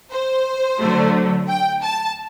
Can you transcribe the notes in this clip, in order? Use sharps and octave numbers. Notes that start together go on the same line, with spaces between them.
C5
D3 F#3 A3
G5
A5